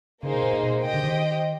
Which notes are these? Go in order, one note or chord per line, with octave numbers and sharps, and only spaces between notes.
C#3 A#3 D#4 G#4 C5
B2
A#2
A#2
B2
A#2
C3 G4 C5 D#5 G5
D3
D#3